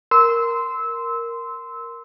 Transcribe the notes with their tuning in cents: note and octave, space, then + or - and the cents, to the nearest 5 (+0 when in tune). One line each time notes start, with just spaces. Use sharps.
A#4 +0 C6 -15 E6 -20